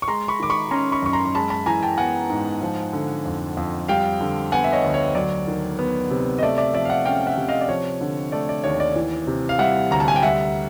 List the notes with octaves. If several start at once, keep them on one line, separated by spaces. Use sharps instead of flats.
C#6
G#3 A#5 C6
B5 C#6
D#3 D6
B5 C#6
C#4 A#5 C6
B5 C#6
F#2 C#6
A#5 C6
C6
G#3 A5 B5
A5 B5
E3 G#5 A#5
G5 A5
B3 F#5 G#5
G#2
F3
D3
F2
F2
G3 F5 G5
D3
B3 F#5 G#5
E5
C#5 D#5
D2
C#5
F#3 D5
D#3
B3
C3
D#5
A3 D5 E5
D5 E5
F3 D5 E5
F5
E5 F#5
C#4 F5 G5
E5 F#5
C3
D#5 F5
D5
F3 C#5
D3
A3 D5
D5
D#2 C#5
D5
E3
C3
F5
G3 E5 F#5
D2 A#5
A5
G#5
G5
G3 E5 F#5